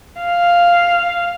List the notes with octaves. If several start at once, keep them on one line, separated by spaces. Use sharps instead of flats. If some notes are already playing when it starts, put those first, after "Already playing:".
F5